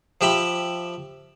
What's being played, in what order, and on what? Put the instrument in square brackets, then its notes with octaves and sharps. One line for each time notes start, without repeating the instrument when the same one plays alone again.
[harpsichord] F3 G4 E5 B5